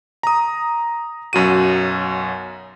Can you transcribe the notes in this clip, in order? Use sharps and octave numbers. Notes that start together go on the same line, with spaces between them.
A#5 D#6
B1 F#2 F#4 D#7